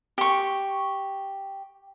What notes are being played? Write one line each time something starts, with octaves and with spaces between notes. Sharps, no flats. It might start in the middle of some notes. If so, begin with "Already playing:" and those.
G4 C#6